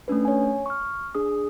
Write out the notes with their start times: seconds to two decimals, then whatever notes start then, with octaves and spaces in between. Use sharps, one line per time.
0.08 A3 C#4 D4 B4
0.25 C#5 G#5
0.66 C#6 F6
1.15 D4 G#4 D#6